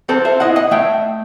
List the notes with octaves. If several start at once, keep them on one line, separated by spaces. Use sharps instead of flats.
C4 A4 C5
C5 E5
E4 D#5 F#5
D#5 F#5
A3 E5 G5